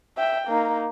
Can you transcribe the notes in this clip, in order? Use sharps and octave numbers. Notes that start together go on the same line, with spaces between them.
E5 G5
A#3 D#4